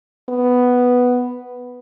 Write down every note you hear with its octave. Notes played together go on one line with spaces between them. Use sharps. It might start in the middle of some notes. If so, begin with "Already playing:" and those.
B3